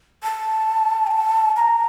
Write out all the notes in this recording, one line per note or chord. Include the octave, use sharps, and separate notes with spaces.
A5
G5
A5
A#5